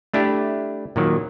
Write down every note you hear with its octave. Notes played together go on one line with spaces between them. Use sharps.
A3 D4 E4 G4
A#2 D#3 F#3